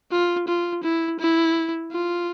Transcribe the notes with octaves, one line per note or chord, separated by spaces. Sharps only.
F4
F4
E4
E4
F4